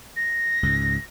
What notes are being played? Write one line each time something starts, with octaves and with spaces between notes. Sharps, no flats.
A#6
C#2 G#2